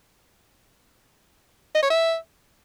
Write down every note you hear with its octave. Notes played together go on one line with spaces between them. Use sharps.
D#5
C#5
E5